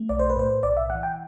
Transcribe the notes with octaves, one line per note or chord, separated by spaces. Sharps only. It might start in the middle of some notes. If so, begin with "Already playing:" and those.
Already playing: A3
B1 D5
C5
B4
A2 C5
B1 D5
E5
E3 F#5
G5